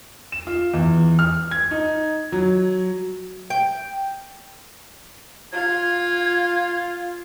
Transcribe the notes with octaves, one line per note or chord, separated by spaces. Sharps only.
E7
F4
E2
F6
G#6
D#4
F#3
G5
F4 G#6